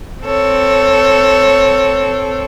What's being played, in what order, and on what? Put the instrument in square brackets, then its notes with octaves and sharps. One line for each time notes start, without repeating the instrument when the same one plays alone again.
[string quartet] C4 A4 C#5